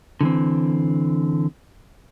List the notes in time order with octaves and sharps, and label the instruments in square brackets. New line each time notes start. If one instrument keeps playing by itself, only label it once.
[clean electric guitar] D3 E3 C4